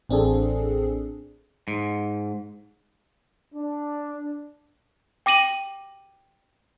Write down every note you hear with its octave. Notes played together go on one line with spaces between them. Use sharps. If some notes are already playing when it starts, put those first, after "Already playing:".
A1 C4 D4 G#4 A4
G#2
D4
G5 D6 A#6 D#7 F#7